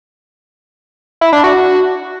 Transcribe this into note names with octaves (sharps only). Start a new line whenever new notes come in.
E4
D4
F#4